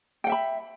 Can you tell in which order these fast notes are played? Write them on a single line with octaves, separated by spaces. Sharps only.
G5 F#5 E5 B5